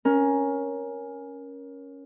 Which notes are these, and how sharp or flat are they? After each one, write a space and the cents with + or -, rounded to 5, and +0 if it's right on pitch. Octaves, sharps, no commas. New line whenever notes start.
C#4 +0 A#4 +15